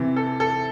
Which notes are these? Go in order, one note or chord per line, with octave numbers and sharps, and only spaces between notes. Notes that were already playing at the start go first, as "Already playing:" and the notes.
Already playing: C3 E3
A4
A4